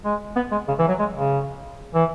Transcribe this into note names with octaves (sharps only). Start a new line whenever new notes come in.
G#3
B3
G#3
C#3
E3
F#3
G#3
C#3
E3